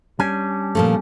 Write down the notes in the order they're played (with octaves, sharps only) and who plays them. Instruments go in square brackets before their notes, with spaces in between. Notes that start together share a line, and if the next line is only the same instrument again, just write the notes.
[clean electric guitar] G3 C#4 D4 [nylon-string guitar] G#5
[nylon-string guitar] A#2 F3 A3